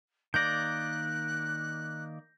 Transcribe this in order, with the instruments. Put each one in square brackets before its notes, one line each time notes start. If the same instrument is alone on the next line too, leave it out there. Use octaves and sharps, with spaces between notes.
[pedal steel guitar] D#3 A#3 D5 [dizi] F#6 [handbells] G6 A#6